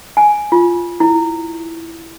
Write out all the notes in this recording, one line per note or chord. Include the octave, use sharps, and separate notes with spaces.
G#5
F4
E4